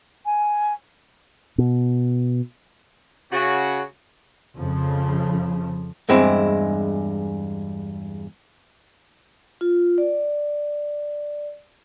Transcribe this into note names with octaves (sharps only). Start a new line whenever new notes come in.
G#5
B2
C#3 F#4
F2 C#3 F3
E2 G2 G#3 C4 E4
F4
D5